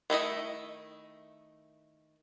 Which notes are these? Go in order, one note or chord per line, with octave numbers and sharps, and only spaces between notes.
D#3 A3 E4 D#5